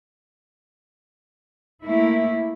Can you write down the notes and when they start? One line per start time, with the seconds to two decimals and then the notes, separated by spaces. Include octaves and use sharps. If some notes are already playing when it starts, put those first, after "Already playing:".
1.84 A3 A#3 E4